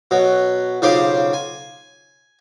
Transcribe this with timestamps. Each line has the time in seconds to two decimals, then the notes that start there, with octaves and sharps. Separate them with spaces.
0.11 B2 F#3
0.82 B1 C#3 F4 C5 F5 D6
1.33 G#5